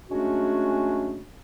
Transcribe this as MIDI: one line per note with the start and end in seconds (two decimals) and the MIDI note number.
0.10 1.23 54
0.10 1.23 56
0.10 1.23 57
0.10 1.23 61
0.10 1.23 62
0.10 1.23 66